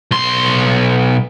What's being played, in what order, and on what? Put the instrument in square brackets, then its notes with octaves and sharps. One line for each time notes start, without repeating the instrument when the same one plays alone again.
[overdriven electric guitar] B1 C6